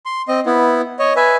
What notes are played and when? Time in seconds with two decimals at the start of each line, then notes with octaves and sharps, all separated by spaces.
0.06 C6
0.28 C4 D#5
0.46 B3 E4
0.99 C#5 D#5
1.16 B4 E5 G#5